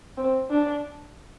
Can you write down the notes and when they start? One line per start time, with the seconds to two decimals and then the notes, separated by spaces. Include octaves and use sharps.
0.17 C4
0.50 D4